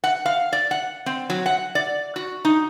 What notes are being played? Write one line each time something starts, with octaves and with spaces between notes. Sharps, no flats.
F#5
F5
D5
F#5
C4
F#3
F#5
D5
F#4
D#4